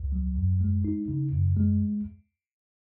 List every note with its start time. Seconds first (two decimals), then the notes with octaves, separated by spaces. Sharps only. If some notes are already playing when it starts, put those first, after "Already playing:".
Already playing: C#2
0.12 F#3
0.37 F#2
0.61 G#3
0.85 D#4
1.08 C#3
1.32 F#2
1.57 G#3